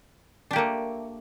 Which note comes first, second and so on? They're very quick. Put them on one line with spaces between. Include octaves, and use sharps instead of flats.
D4 G4 A#3 A3